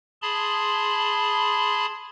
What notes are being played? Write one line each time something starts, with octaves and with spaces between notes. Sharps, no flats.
G#4 A5 B5 C6